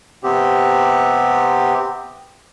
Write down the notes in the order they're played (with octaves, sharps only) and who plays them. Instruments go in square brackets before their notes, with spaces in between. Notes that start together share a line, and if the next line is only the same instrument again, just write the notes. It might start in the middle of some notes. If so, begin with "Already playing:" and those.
[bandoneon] C3 B3 C4 G4